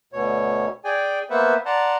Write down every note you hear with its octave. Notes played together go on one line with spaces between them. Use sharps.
D2 B2 C#5
G#4 D5 G5 G#5
A#3 B3 B4 C5 E5 F#5
D5 F#5 A5 A#5 C6